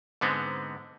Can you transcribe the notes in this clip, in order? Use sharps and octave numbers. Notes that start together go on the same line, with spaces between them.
G#2 D3 G#3 B3 C4